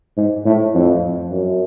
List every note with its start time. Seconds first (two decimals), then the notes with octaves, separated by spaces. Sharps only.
0.17 G#2
0.46 A2
0.75 F2
1.31 F#2